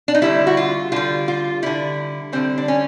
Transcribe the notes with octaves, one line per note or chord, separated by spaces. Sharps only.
D4
D#4
D3 G3 E4
F#4
F4
D3 G3 F4
F4
D3 G3 E4
D3 G3 C4
D4
C#4